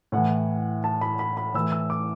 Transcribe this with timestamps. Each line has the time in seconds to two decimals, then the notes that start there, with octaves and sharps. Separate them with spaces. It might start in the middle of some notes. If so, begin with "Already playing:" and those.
0.12 A2 E3 F#5
0.84 A5
1.01 B5
1.19 B5
1.37 B5
1.54 A2 E3 E6
1.72 E6
1.90 D6